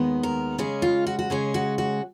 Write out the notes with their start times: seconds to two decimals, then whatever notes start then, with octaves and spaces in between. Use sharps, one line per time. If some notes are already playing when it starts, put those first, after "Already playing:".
Already playing: D#2 D#3 G#3 B3
0.23 A#4
0.58 C#3 G#3 C#4 G#4
0.82 F4
1.07 F#4
1.19 F#4
1.30 C#3 G#3 C#4 G#4
1.54 F#4
1.78 F#4